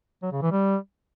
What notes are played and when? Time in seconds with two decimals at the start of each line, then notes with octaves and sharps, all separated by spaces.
0.23 F#3
0.32 C#3
0.42 E3
0.51 G3